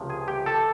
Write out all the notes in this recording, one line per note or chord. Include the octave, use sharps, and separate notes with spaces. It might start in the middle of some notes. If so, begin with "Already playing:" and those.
Already playing: C#2 C3 F3 A3
G#4 G#5
G4 G5
A4 A5